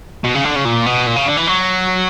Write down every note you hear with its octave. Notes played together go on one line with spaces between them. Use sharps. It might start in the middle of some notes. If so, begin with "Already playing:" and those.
B2
C#3
D3
C#3
A#2
B2
A#2
C#3
D3
E3
F#3